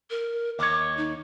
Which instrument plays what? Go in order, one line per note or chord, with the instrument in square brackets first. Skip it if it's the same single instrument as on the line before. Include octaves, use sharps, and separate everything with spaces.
[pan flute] A#4
[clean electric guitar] D#2 C#5 [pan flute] D6
[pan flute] D#4